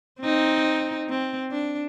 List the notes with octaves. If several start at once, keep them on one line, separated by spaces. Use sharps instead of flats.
C4 D#4
C4
D4